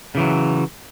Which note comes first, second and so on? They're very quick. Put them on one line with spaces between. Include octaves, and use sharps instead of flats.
C#3 E3 F#3